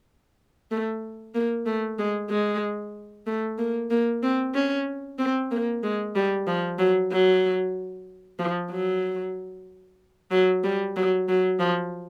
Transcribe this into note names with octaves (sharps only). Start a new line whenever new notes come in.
A3
A#3
A3
G#3
G#3
A3
A#3
A#3
C4
C#4
C4
A#3
G#3
G3
F3
F#3
F#3
F3
F#3
F#3
G3
F#3
F#3
F3